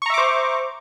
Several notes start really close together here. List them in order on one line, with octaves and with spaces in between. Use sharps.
C#6 A#5 E5 D6 C5